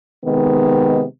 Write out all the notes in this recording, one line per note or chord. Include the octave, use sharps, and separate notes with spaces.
C3 D#3 G#3 B3